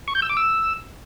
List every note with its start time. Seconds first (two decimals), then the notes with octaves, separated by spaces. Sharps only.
0.08 C#6
0.15 G6
0.22 E6
0.29 D6
0.37 E6